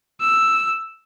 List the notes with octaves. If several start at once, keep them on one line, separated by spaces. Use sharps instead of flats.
E6